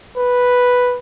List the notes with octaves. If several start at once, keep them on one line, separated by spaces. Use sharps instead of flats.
B4